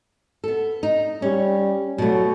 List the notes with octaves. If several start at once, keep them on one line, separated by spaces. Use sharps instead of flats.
B3 A4
D#4
G3 C#4
B2 F#3 A3